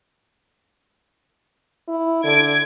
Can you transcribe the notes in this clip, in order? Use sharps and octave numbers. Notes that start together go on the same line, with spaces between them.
E4
D3 G#6 D7